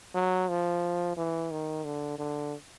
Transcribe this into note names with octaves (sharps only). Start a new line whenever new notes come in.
F#3
F3
E3
D#3
D3
D3